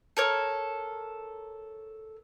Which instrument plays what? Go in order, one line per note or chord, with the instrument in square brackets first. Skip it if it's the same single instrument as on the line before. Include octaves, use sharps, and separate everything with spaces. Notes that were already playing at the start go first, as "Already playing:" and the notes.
[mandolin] A4 A#4 C#5